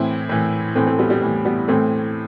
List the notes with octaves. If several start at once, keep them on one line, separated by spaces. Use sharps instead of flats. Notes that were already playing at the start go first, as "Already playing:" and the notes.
Already playing: A2 E3 C4 E4
A2 E3
A2 E3 A3 C4
A3 C4
G3 B3
G3
A2 E3
G3 B3
A2 E3 A3 C4